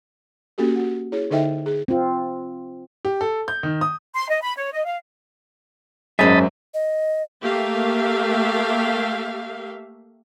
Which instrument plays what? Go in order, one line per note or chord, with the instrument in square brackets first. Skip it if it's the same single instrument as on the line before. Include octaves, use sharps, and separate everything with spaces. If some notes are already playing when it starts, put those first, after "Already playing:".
[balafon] A#3 C#4 F#4 G4 A4
F#4 F#5
E4 G#4 C#5
D3 D#4 A4 D#5 E5 G5
G#4
[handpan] C4 F4
[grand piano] G4
A4
G6
D#3
D#6
[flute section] C6
D#5
B5
C#5
D#5
F5
[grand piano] G#1 F#2 [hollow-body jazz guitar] C#4 G#4 E5 [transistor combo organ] D#5 A5 B5
[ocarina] D#5
[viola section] A3 A#3 G4 E5 F5